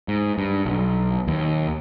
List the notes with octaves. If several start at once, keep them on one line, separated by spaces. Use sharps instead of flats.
G#2
G2
B1
D#2